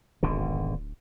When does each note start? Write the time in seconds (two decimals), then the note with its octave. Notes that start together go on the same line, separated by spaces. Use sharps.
0.23 D1 G#1 B2 D3